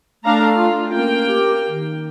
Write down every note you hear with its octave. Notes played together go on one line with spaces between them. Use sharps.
A3 D4 F5 A#5
F4
A#3 C#4 G5
G4
D#3